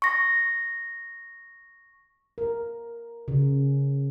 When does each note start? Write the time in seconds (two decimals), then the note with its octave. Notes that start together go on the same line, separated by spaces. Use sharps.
0.02 C#6 A#6
2.38 A#4
3.28 C#3